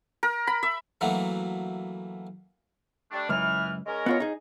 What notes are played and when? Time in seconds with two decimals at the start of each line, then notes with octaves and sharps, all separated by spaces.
0.23 A#4
0.47 B5
0.63 E5
1.01 E3 F#3 A3 A#3 F#4
3.11 G3 A3 D4
3.29 C#2 F#2 E3 F6
3.86 G#3 C#4 A#4
4.06 B3 F4 C#5
4.20 D#4 G#4